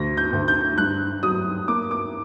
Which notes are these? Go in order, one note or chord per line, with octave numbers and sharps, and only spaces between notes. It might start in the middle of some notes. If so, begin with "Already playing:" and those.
Already playing: D2 A#6
G6
D2
G6
G2 F#6
F#3 D#6
A#3 D6
D6